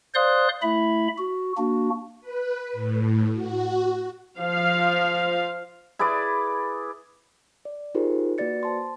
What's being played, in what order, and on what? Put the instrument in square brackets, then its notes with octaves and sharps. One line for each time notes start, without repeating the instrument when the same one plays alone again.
[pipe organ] C5 D5 F5 C6 D#6 F#6
A3 E4 E5 B5
F#4
A#3 D4 F#4
[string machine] B4
A2
F#4
[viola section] F3 F5
[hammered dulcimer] E4 G#4 B4 D5
[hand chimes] D5
D#4 F4 G4 G#4 A#4 C5
A#3 F#4 B4 D5 A6 C#7
C5 A5 C6